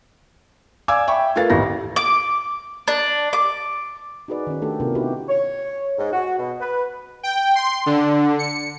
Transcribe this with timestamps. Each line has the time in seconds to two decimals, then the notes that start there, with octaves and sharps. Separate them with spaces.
0.88 D5 F5 G#5 D6 E6 G#6
1.07 E5 G5 B5 C#6
1.35 A3 F4 A#4 B4 F5 A6
1.50 A1 D#2 E4 A#6
1.96 D6
2.88 D4
3.33 D6
4.28 D#4 F#4 G#4 B4 D5
4.47 D#3 C#4
4.62 A3 D4 G4 A4
4.80 C3 B3 D4 F4 A#4
4.95 D#4 E4 F#4 G4 B4
5.29 C#5
5.98 G#2
6.13 F#4
6.39 B2
6.60 B4
7.23 G5
7.55 C6
7.86 D3
8.39 C#7